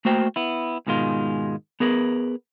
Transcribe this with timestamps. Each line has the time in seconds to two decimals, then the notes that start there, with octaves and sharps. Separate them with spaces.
0.05 A3 A#3 F#4 C5 G5
0.36 B3 E4
0.87 G#2 B2 D#3 G#3 F4
1.80 B3 G#4 A#4 B4